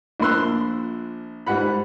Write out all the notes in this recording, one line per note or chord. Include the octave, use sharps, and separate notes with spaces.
A#1 F3 A#3 C6 E6 F#6
G#2 G3 F#5 B5